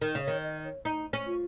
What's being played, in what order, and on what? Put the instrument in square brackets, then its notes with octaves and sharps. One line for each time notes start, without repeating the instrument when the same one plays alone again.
[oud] D#3 [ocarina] A#4
[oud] C#3 [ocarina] D#5
[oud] D#3 [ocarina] C#5
[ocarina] D#5
C#5
[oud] D#4
C#4
[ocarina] F4